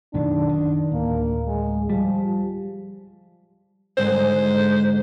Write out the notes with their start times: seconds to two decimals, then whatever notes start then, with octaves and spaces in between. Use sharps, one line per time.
0.14 B1 F#2 D#3 D4
0.49 D#3
0.92 D1 A#3
1.47 G#3
1.90 F3 G3
3.97 G#2 D3 G#3 C5